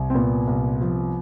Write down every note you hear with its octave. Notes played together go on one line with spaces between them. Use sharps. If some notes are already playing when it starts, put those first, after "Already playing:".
Already playing: C2
C4
A#2 B3
C2
F3